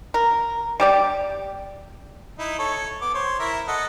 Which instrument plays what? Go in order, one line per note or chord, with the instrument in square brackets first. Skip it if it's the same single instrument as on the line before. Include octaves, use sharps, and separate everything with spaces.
[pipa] A#4
G3 G4 D5
[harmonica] D#4 E4
A4 C#5
B3 D6
C5 C#5
E4 A#4 E5
A4 D#5 F#5